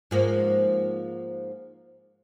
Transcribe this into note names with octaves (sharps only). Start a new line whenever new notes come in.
G#2 F3 A#3